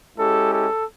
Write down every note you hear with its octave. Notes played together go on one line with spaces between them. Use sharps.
G#3 C#4 E4 G4 A4
A4